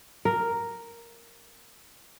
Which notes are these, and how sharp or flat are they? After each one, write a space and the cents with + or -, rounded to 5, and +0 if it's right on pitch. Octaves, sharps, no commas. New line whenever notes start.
A#4 +0